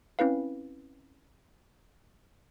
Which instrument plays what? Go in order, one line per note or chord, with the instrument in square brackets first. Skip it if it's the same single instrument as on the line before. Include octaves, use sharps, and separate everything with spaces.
[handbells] C4 C#4 E4 B4 F5